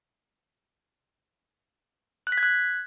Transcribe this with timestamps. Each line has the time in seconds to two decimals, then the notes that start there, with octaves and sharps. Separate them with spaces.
2.27 F#6
2.32 B6
2.38 G#6
2.43 F#6